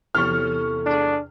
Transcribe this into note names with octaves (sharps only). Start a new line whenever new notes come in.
E2 C3 E3 C#4 A4 C#6 F6
G#2 D4 G#4